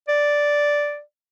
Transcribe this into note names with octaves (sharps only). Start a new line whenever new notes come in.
D5